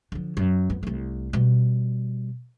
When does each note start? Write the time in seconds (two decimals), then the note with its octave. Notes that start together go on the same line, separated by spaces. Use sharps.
0.12 D3 F3
0.37 F#2
0.70 F2 B3
0.83 C2 A3
1.33 B2 G3